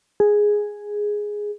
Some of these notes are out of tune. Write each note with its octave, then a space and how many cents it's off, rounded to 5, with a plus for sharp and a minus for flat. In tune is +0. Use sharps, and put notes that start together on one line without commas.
G#4 +0